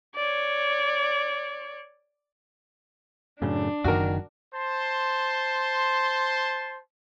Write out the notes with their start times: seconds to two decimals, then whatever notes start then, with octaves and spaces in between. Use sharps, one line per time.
0.15 C#5 D5
3.42 F#2 A2 C#3 D4
3.84 F#1 F#2 D3 D#3 F#4 A#4
4.54 C5 A5 C6